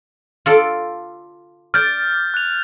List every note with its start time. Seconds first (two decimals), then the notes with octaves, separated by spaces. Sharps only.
0.46 F4 A4 D5
1.74 D5 F6 G6 A6
2.34 F#6 F7